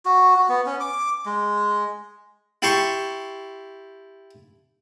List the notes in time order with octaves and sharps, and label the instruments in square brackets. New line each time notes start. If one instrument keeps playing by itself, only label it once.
[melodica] F#4
F#4
B3
C#4
D6
G#3
[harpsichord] E4 G4 A5 C6 C#6